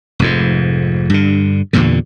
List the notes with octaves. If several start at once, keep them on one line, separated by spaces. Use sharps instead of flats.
F1 F2 G#2
G2 D3
E2 G2 A#2 D3